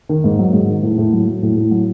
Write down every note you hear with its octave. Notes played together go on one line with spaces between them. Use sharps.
D#3
G#2
F#3
G#2
D#3
A2
A2
F#3
F#3
A2
A2
F#3